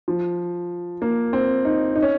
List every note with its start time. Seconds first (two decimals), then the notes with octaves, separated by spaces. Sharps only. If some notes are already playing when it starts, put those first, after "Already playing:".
0.08 F3
1.02 A#3
1.33 C4
1.65 D#4
1.95 D#4
2.03 C#4